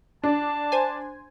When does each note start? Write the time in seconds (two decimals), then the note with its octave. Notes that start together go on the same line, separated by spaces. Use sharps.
0.24 D4 A5
0.72 C5 G#5